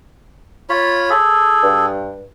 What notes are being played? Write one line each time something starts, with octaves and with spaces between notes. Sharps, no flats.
F4 C#5 B5
G#4 A4
G2